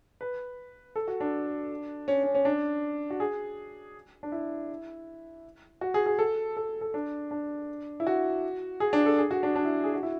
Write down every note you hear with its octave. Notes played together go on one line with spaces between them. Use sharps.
B4
A4
F#4
D4
C#4
C#4
C#4
D4
F#4
G#4
D4
E4
F#4
G#4
G#4
A4
A4
A4
D4
D4
E4
F#4
G#4
D4
A4
G#4
F#4
D4
D4
E4
G#4
F#4
E4